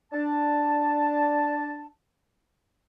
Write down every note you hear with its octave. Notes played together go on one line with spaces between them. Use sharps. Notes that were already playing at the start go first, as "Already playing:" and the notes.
D4 A5